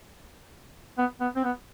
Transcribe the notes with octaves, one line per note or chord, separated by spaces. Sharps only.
B3
B3
C4
B3